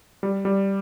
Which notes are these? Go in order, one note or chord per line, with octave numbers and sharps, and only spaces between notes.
G3
G3